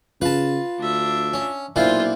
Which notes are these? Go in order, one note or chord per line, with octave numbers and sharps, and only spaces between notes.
C#3 F4 B4 A5
D2 D4 E5
C#4
B1 A#2 D4 E4 F4 C5